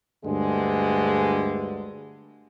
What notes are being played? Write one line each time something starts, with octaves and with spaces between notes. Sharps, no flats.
D2 G2 D3 G#3